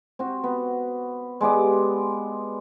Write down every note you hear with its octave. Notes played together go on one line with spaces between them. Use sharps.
C4 F#4
B3
G#3 B3 G4 D5